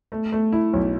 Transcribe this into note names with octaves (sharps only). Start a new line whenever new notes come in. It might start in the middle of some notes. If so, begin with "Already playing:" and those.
A3
A3
E4
B1